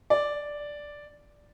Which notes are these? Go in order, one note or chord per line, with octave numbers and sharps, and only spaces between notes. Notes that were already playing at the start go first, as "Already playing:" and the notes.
D5